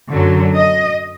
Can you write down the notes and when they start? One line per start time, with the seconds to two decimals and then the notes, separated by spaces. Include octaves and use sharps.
0.10 F#2 D3 F#3
0.55 D#5